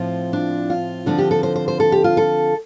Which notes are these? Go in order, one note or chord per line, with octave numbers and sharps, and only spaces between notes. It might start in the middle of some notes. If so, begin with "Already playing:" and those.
Already playing: A2 F3 C4 F4
D4
F4
D3 F3 C4 D4
G4
A4
C5
C5
C5
A4
G4
F4
A4